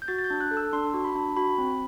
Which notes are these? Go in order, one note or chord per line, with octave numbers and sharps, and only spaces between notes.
G6
F#4 A6
A6
G6
D4
F#6
A4
E6
D4 C6
F#4
B5
D4
F#4 B5
C4